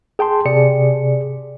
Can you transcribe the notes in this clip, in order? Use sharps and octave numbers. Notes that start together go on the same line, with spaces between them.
G#4 G5 A5 C6
C3 G#4 D5 C#7